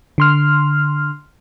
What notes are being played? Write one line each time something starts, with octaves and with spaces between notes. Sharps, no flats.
D3 C6 F6